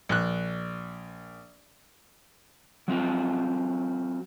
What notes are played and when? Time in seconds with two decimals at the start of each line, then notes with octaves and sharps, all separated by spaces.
0.09 A#1 F#6
2.88 F#3 C4 F4 F#4